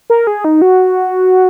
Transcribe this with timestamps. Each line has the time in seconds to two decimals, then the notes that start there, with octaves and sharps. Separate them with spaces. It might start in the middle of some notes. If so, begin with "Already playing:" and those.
0.10 A#4
0.27 G#4
0.44 D#4
0.62 F#4